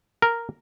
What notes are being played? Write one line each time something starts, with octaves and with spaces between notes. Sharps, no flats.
A#4